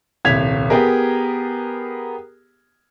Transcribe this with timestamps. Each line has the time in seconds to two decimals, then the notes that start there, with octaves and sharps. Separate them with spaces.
0.25 D#1 C2 G#6 B6 F7
0.70 B3 G4 G#4 A#4